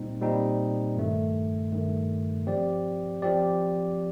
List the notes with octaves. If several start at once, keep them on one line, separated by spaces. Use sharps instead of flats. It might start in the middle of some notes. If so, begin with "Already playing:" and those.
Already playing: A#2 G3 C4 D#4
A#2 G3 C4 D#4
G2 D#3 A3
G2 D#3 A3
F3 C4 G4 D5
F3 C4 G4 D5